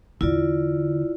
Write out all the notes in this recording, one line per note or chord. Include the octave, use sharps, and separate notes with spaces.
E2 D3 E4 F4 D5